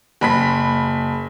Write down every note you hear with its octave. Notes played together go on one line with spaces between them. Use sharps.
F#1 B5 B6